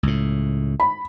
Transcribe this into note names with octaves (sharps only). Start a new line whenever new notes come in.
C#2 A2
B5